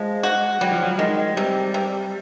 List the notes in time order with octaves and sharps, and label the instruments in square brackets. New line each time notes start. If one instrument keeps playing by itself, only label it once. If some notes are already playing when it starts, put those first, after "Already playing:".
Already playing: [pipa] F3 [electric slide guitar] G#3
[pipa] F#4
[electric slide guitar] F#3 [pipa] G3
[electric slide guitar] F3
F#3
[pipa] D#3 [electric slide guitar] G#3
[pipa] C3 [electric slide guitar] G3
[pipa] C3